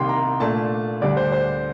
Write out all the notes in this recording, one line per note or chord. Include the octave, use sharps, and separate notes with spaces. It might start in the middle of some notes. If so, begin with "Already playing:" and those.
Already playing: C2 C3 D#3 G3 A#3 G5 C6
A#5
A#2 A3 D4 A5
D2 D3 G3 D4 D5
C5
C5